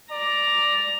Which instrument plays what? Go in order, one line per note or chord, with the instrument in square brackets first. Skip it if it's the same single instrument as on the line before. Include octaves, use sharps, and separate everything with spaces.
[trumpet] D5 [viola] A#5